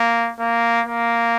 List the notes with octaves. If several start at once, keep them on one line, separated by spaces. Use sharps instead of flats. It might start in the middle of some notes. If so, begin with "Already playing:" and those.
Already playing: A#3
A#3
A#3